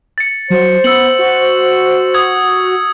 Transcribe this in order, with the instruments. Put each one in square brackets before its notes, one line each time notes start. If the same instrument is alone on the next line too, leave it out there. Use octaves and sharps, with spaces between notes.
[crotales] A6 C#7
[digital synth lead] F#3 [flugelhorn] C5
[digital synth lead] B3 [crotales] E6 C#7 F#7
[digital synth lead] F#4
[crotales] D#6 G#6